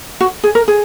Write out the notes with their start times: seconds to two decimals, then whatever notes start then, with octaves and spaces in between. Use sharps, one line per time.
0.21 F#4
0.44 G#4
0.55 A#4
0.68 G#4